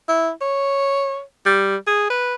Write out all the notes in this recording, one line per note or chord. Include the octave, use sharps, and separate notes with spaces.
E4
C#5
G3
G#4
B4